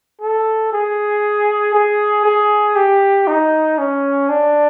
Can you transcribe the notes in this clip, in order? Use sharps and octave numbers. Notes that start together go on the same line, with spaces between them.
A4
G#4
G#4
G#4
G4
D#4
C#4
D4